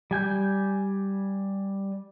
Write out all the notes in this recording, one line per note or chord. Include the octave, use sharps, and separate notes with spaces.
G3 G#5 G6